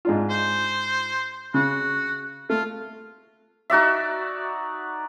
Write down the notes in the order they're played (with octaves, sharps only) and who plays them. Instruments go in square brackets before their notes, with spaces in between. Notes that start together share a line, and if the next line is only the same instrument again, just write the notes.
[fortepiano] G#2 D4 F4
[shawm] C5
[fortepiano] C#3 [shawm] F#4
[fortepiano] A3 [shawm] F4
[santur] D#4 F#4 D5 E5